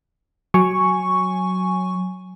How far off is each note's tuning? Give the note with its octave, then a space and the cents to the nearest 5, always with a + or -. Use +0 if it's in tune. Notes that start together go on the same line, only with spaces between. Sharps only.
F#3 +0 G#5 +0 C#6 +0